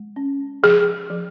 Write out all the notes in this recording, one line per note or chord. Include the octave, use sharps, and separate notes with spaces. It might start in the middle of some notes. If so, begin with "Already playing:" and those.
Already playing: G#3
C#4
F3 G#4
F3